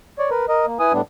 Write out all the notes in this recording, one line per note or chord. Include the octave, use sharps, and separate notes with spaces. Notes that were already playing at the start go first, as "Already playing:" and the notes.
C#5 D5
A#4 B4
A#4 D#5
A#3
E4 B4 G#5 D#6
A2 G3 B3 D4